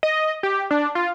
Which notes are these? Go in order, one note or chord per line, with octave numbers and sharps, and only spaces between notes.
D#5
G4
D4
F4